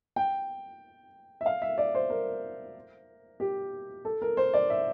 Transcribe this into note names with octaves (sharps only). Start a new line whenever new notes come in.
G5
E5
F5
E5
D5
C5
A#4
G4
A4
A#4
C5
D5
E5